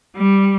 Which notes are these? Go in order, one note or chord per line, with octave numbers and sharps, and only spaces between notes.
G3